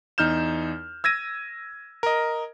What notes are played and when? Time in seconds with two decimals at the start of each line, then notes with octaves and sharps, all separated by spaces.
0.18 E2 D#4 F6 G6 E7
1.04 E6 G#6 A#6 D#7
2.03 A#4 D#5